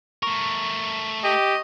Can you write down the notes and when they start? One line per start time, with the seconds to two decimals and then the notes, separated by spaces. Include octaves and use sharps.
0.23 A3 A#4 C#6
1.24 G4 D#5